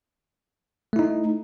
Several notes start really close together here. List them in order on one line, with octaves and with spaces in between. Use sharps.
A3 E4 D#4